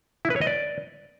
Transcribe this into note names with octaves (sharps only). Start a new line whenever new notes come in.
E4
B4
C#5
D#5
D5